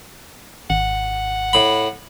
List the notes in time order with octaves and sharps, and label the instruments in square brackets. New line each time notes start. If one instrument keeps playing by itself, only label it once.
[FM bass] G#1 [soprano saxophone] F#5
[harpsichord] A2 B5